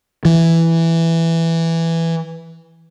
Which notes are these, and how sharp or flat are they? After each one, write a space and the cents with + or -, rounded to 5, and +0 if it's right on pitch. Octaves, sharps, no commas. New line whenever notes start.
E3 +5